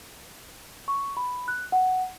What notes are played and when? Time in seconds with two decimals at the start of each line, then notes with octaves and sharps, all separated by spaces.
0.88 C#6
1.17 B5
1.48 F#6
1.72 F#5